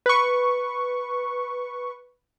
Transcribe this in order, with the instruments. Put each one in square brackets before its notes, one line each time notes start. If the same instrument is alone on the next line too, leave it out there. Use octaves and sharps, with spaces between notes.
[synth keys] B4 C#6